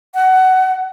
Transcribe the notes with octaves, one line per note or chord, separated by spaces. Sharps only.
F#5